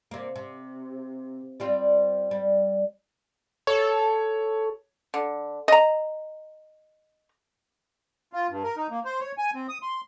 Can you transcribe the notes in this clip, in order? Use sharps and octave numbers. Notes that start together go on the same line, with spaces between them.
C3 A#3
C3
G3 C4 F4
G3
A4 C#5
D3
D#5 A#5
F4
G2
A#4
D#4
A#3
C5
C#5
G#5
C4
D#6
C6